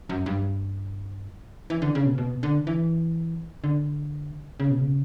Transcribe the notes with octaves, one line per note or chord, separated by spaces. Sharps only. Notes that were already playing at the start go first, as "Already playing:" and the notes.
F#2
G2
E3
D3
C#3
B2
B2
D3
E3
D3
C#3
B2
C#3